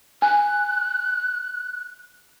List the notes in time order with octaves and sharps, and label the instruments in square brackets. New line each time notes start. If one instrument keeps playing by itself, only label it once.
[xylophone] G#5 [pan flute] F#6